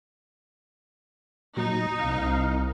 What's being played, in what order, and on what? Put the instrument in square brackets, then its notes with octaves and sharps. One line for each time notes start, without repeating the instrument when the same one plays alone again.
[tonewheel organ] A#2 F#3 [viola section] D#4
[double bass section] C2 [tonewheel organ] F5